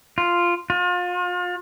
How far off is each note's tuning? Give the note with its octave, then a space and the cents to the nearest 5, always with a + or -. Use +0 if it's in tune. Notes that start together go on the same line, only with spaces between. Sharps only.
F4 -5
F4 +35